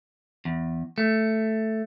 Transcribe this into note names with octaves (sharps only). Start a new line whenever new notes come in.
E2
A3